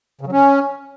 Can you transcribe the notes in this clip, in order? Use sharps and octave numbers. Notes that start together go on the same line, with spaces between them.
C#3
F#3
C#4